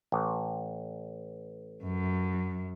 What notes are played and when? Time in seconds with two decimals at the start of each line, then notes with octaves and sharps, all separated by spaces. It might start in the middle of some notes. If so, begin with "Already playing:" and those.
0.12 A1
1.84 F#2